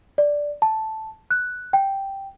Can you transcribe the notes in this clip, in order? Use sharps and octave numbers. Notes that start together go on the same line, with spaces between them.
D5
A5
F#6
G5